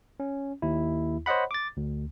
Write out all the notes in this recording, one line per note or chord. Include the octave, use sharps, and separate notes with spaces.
C#4
D#2 E4
C5 C#5 D#5 F#5 B5
D6 A6
D2